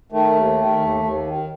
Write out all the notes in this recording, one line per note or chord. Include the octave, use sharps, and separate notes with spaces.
D#3 A3
D#2
D#3
D#2
D#2
D#3